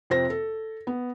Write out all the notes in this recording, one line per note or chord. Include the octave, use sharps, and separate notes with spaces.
F2 C3 C4 C5 A#6
A4
B3